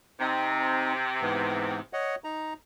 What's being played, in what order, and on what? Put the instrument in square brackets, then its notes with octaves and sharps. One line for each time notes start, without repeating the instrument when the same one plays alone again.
[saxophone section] C3 [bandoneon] C4 D#4
[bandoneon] G#2 E3 B3
C#5 D#5 F#5
D#4 A#5